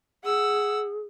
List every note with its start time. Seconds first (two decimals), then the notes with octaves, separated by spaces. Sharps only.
0.25 G#4 F#5 E6